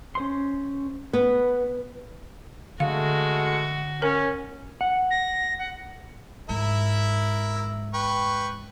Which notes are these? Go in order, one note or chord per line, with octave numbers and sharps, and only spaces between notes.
C#4 C5 C6
B3 B4
D3 G#3 A3 F#4 F5
C#4 A#4
F#5
A#6
F#5
G#2 E4 A#4 E5
B4 G5 C#6